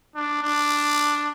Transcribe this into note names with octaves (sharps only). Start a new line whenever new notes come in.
D4
D4